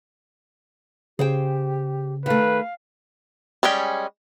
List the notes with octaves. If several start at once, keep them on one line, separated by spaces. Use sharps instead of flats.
C#3 G4 G#4 C5 G5
D#3 A3 B4 F5
G3 G#3 C#4 G5